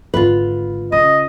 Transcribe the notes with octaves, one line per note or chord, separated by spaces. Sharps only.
G#1 D3 F4 B4
C#3 D#5